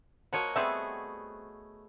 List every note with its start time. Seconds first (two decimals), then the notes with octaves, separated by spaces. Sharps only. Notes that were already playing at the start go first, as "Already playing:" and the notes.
0.33 F3 A#3 F#4 C#5 D#5
0.56 G3 A3 B3 C4 G#4 E5